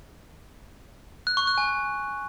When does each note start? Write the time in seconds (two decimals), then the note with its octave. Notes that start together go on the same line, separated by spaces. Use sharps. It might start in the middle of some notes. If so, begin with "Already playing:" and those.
1.27 F#6
1.37 C#6
1.47 F#6
1.58 G#5
1.68 F#6